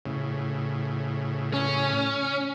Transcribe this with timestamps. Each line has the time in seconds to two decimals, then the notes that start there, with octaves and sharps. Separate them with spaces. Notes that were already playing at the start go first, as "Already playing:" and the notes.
0.06 A2 C#3
1.54 C#4